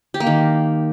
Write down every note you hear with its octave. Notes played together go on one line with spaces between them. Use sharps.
G4
A#3
D#3